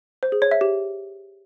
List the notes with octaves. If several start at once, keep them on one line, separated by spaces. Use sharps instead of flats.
C5
G#4
C#5
E5
G4